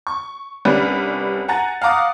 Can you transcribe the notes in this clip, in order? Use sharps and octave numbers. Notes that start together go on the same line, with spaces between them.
C#6
C2 G3 C#4 D4 B4
F#5 G#5 A#5 F#6 A6
F5 F#5 A#5 D6 D#6 F#6